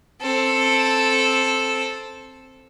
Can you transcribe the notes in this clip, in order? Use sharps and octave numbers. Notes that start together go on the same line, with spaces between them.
C4 A4